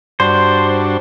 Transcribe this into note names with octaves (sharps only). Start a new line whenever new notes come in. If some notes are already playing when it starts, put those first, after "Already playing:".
G2 D4 F#4 C5